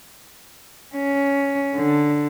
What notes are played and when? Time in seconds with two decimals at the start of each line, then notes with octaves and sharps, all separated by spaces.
0.96 C#4
1.76 D3